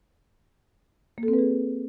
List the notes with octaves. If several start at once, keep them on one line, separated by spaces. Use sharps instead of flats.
A#3
A4
C4
B4
G#4